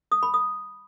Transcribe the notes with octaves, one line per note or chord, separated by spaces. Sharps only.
D#6
B5
D#6